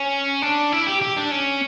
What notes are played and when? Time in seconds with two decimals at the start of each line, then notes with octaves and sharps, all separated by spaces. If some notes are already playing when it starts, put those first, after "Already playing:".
Already playing: C#4
0.42 D4
0.72 E4
0.86 G4
1.01 G4
1.17 D4
1.31 C#4